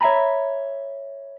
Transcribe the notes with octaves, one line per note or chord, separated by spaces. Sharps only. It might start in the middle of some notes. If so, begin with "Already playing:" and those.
C#5 E5 F5 G#5 A#5 B5